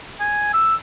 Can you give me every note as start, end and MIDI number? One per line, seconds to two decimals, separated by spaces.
0.20 0.52 80
0.54 0.75 88